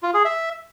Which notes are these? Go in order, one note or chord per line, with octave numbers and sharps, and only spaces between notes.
F4
G#4
E5